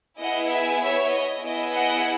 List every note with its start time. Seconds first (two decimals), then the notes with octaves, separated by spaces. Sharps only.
0.21 B3 E4 G#4 D#5 F#5
0.52 E5 G#5
0.82 C#5 E5
1.12 D#5
1.42 B3 E4 G#4 D#5
1.72 D#5 F#5